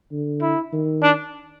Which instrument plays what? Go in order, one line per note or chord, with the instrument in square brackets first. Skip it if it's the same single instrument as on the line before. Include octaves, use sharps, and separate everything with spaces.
[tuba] D3
[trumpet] E4
[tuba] D#3
[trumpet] D4